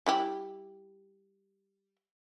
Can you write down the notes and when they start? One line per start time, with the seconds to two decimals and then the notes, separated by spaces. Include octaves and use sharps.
0.06 G3 E4 G4